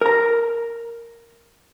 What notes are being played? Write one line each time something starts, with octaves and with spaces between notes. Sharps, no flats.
A#4 A#5